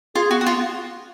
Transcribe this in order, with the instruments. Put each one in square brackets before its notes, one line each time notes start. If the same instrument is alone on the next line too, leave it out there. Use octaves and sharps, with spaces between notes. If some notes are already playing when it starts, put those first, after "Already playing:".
[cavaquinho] F4 [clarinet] G#4
[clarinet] B3 [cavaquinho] F#4
[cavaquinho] F#4
[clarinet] B3 [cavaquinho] F4
[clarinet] B3